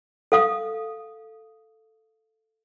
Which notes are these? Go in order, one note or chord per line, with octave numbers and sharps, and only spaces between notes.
A4 F5 D#6